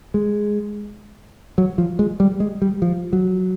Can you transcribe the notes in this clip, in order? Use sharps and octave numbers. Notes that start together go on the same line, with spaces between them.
G#3
F#3
F3
G#3
G3
G#3
G3
F3
F#3